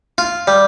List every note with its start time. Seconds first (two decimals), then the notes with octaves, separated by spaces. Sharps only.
0.18 F4
0.48 G3